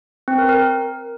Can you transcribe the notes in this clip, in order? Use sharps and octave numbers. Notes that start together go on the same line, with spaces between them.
C4
A#4
A#4